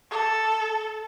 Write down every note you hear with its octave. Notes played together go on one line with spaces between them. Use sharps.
A4